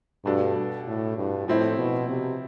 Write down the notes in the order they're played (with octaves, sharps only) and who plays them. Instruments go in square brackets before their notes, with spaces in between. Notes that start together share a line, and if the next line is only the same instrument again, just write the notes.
[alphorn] G2 [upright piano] B2 A3 D4 A4
[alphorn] A2
G2
[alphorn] A2 [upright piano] F3 C4 E4
[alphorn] B2
C3